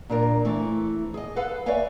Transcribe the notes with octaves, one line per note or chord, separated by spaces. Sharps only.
A#2 D4 A#4
E3 A3 C4
G#4 D#5
A4 B4 F5 F#5
B4 C#5 D5 E5 F5 G#5